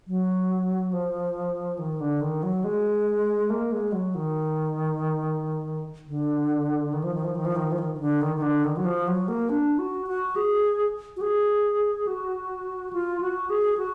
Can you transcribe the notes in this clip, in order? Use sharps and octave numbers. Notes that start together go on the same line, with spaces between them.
F#3
F3
D#3
D3
D#3
F#3
G#3
A#3
G#3
F#3
D#3
D3
D#3
F3
D#3
F3
D#3
F3
D#3
F3
D#3
D#3
D3
D#3
D#3
D3
D#3
F#3
F3
F#3
A#3
D4
F#4
F#4
G#4
F#4
G#4
F#4
F4
F#4
G#4
F#4